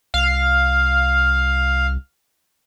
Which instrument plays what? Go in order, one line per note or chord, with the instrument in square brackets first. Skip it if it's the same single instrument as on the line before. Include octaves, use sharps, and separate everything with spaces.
[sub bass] C2 [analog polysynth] F5